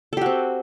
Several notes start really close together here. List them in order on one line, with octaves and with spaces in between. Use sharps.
A4 G4 F#4 C4